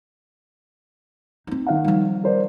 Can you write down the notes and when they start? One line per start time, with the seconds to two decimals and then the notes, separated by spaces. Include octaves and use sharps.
1.47 C4 D#4
1.67 D#3 F5 F#5
1.84 F3 G3
2.24 A#4 C5 D5